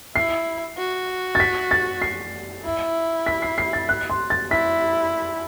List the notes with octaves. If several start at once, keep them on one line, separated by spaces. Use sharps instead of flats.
E4 C7
F#4
A6
B6
A6
C7
E4
B6
C7
C7
A6
F#6
C6
A6
E4 B6